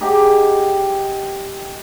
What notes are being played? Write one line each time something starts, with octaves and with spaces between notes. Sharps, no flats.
D#4 G4 G#4 F#5